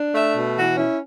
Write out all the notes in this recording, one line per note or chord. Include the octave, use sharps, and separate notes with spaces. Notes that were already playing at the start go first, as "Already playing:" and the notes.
Already playing: D4
A3 E5
B2
E3 F#4
C#4 E4